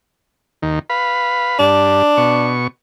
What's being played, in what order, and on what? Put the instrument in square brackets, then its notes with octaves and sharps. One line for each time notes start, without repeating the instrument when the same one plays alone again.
[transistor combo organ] D#2 D#3
B4 F5 B5
[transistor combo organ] G2 [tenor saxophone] D4
[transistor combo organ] B2 C#6